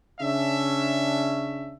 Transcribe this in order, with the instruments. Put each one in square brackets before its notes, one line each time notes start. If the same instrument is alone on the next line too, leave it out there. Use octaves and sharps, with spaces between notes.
[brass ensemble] C#3 C#4 D4 E5